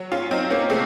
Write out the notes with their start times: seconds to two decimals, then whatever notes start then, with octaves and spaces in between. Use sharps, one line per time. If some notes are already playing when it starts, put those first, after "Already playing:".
Already playing: F#3
0.12 C#4 F4
0.31 F#3 C4 D#4
0.50 A#3 C#4
0.70 C3 A3 C4